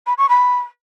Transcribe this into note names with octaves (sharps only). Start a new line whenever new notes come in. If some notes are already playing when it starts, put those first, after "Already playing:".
B5
C#6
B5